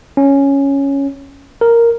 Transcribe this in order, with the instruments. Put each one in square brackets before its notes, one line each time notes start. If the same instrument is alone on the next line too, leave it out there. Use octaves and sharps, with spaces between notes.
[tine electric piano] C#4
A#4